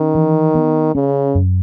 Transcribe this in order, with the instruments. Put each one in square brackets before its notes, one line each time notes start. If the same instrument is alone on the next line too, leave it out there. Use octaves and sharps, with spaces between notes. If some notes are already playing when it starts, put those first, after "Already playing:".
Already playing: [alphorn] D#3 [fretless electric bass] C#4
[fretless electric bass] E3
B3
[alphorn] C#3 [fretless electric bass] C#4
[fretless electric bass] F#2